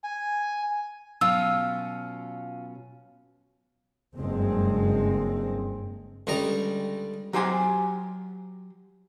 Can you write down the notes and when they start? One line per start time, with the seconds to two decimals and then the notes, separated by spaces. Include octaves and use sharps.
0.04 G#5
1.21 B2 F#3 C#4 F4 E6
4.16 F#1 G2 G#3 C4
6.27 C#2 D3 G3 D#5 A#5
7.33 F#3 G4 C5 G#5